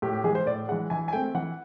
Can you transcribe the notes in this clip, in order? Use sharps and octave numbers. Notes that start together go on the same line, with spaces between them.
A2 G4
G4
E3 G#3 G#4
C5
A2 D5
E3 G#3 F#5
E3 G#5
G#5
A3 C4 G5
E3 F#5